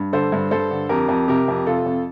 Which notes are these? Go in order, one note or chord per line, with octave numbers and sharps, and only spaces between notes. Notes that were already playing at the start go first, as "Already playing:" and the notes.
Already playing: G2
D3 A4 C5
G2
G2 A4 C5
D3
F2 G4 A#4
F2
C3 G4 A#4
F2
C3 F4 A4
F2